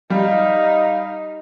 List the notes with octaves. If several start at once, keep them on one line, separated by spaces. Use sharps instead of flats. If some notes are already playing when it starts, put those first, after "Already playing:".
G3 D#4 F5